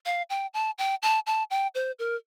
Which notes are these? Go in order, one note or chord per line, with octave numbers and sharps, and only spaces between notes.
F5
G5
A5
G5
A5
A5
G5
C5
A#4